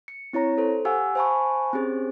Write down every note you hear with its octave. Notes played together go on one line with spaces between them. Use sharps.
C#7
C4 E4 C#5 A#5 A#6
A4 C5
G4 F5 F#5 G#5 E6
C5 F5 G#5 A5 B5 C#6
C4 C#4 G4 G#4 C5